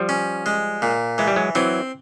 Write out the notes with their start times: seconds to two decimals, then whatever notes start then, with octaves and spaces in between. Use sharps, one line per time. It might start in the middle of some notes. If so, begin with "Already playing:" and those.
Already playing: F3 G3
0.09 C#4
0.46 G#3
0.82 A#2
1.18 E3 G#3
1.27 G3
1.36 F#3 G#3
1.55 E3 F#3 C4